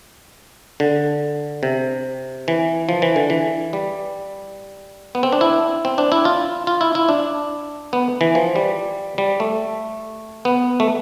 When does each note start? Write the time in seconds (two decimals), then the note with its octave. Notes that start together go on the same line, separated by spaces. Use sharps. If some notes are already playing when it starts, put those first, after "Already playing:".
0.80 D3
1.63 C3
2.48 E3
2.89 F3
3.02 E3
3.16 D3
3.30 E3
3.73 G3
5.15 B3
5.23 C4
5.32 D4
5.41 E4
5.85 C4
5.98 D4
6.12 E4
6.25 F4
6.67 F4
6.81 E4
6.95 E4
7.09 D4
7.93 B3
8.21 E3
8.35 F3
8.56 G3
9.18 G3
9.40 A3
10.45 B3
10.80 A3